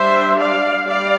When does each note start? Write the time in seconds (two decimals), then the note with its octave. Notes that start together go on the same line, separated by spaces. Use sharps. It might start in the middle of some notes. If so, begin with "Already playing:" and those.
Already playing: G3 D4 C5 E5
0.38 D5 F5
0.87 G3 D5 F5